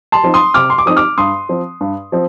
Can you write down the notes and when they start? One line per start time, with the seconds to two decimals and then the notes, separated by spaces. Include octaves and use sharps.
0.12 A5 C6
0.24 F3 C4 D#4
0.34 C6 D#6
0.54 C3 D6 F6
0.70 C6
0.78 D6
0.86 F3 C4 D#4 D#6
0.96 D6 F6
1.18 G2 C6 D#6
1.49 F3 C4
1.81 G2
2.12 F3 C4